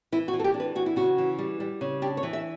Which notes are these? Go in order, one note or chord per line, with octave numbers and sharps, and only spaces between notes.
E3 E4
F#4
E3
A4
G4
D4
B4
E3 F#4
E4
C#3 F#4
E3
G3
G3
C#3
D4 G4
C#5
E3
E5